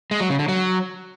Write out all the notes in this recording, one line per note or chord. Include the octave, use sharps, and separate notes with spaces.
G#3
F#3
C#3
D3
F#3